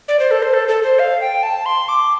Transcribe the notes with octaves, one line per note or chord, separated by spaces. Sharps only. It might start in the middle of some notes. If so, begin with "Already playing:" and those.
D5
C5
A4
C5
A4
A4
C5
F5
G5
A5
C6
D6